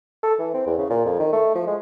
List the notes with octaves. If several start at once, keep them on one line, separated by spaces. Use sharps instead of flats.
A4
E3
C4
E2
C#3
A#2
F2
D#3
A3
F3
G#3